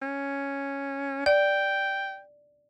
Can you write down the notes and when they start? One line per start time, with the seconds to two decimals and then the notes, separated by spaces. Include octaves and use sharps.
0.02 C#4
1.26 D5 G5